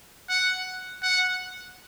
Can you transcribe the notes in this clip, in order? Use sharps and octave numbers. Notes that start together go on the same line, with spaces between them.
F#5
F#5